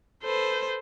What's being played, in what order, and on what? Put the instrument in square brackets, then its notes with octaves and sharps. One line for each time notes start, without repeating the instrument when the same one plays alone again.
[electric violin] A4 B4 [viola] C5